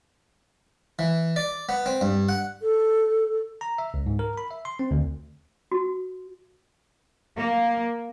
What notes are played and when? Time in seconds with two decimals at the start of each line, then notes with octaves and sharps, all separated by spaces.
0.99 E3
1.36 D5
1.69 B3
1.86 C4
2.01 G2
2.29 F#5
2.61 A4
3.61 A#5
3.78 E5
3.94 C#2
4.06 G#2
4.19 A#4
4.37 B5
4.51 E5
4.65 C6
4.79 C4
4.91 D2
5.72 F#4
7.37 A#3